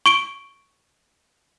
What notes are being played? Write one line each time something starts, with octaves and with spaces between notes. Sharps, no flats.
C#6 D7 G7